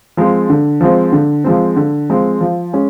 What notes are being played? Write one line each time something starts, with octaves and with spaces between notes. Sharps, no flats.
F3 G#3 C4
D3
F3 G#3 C4
D3
F3 G#3 C4
D3
F3 G#3 C4
F3
G#3 C#4